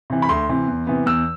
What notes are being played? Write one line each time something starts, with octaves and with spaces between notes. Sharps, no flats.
C3 E3
B5
D2 C6
C3 E3
E2
C3 E3 B3
E2 E6